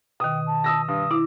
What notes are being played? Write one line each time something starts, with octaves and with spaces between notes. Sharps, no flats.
B2 D#3 G5 D#6
A5
D#6 E6 A#6
G2 D#6
E4 D6